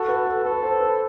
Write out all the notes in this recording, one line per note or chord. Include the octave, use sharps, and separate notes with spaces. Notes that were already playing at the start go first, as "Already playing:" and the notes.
Already playing: F#4 A4
B4
A4
A4 B4
C5
B4